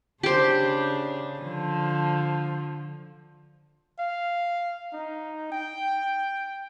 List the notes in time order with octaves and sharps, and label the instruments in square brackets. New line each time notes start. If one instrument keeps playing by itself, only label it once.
[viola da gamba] C#3 D4 [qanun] G4 C5
[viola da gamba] D3 F3
[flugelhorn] F5
D#4
G5